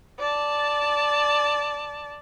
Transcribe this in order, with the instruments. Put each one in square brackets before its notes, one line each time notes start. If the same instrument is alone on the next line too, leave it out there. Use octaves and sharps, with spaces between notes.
[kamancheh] D5 A5